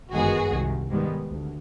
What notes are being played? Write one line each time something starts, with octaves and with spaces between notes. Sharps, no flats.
G1 F#2 D#3 G#3 B3 F#4 G#4
C2 C3 D#3
G#2 D#3 G3 B3
D2